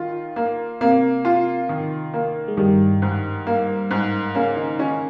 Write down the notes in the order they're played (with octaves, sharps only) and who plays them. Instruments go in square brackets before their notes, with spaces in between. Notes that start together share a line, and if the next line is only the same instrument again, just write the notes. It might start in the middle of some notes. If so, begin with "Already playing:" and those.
Already playing: [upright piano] D#3 F4
A#3
[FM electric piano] C3 [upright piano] A#3
[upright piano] F4
D#3
A#3
[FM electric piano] G#3
[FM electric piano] G2 G3 [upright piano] D#3
[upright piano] G#2
A#3
G#2
[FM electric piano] C#3 C#4 [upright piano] A#3
[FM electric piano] D#3 D#4
[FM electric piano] D#3 D#4 [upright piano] C#4